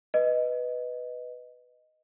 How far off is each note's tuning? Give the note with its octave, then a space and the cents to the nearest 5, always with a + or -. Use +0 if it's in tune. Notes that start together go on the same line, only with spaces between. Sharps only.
B4 +0 D#5 +0